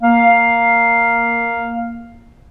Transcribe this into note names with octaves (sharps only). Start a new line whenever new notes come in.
A#3 F5